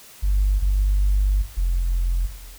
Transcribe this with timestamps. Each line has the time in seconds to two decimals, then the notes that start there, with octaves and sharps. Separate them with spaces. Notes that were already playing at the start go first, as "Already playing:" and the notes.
0.22 G1
0.61 G1
1.57 F1